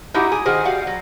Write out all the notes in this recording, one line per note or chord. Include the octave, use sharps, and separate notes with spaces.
D#4 E4 F#4 G4
G#4
D#3 F#4 G#4 C5
G3 F5 F#5
F#3